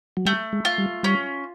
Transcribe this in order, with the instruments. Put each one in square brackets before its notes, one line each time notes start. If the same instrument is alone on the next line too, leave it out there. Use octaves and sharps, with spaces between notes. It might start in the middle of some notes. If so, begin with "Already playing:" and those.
[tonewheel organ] F#3
[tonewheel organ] G3 [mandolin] A3
[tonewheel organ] G#3
[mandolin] F4
[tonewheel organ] G3
[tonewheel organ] G3 [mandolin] C#4